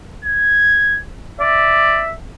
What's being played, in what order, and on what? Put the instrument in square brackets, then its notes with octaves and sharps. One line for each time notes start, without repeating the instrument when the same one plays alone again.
[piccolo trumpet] G#6
[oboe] D5 [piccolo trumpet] E5